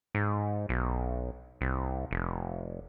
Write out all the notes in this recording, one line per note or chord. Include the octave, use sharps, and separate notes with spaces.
G#2
B1
C2
F1